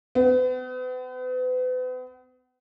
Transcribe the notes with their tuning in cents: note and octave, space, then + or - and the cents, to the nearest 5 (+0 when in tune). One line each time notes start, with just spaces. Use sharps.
B3 +40